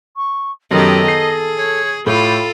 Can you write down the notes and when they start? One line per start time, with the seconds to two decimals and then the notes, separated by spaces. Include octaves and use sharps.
0.16 C#6
0.71 F#2 D#3 B3 G4 A4 D#5
1.08 G#4 C7
1.58 C#5
2.06 A2 F4 G4 A4 B5